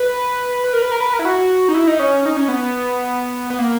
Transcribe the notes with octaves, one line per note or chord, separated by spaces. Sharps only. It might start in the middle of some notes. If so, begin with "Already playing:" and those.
Already playing: B4
B4
A#4
B4
A#4
B4
A#4
E4
F#4
D#4
E4
D#4
C#4
D#4
C#4
B3
B3
A#3